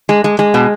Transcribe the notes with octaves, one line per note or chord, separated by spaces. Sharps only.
G#3
G#3
G#3
B2